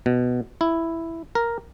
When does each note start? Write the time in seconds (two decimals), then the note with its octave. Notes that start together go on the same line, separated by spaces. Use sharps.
0.06 B2
0.61 E4
1.35 A#4